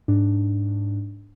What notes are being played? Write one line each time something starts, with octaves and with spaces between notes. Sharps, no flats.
G#2 D4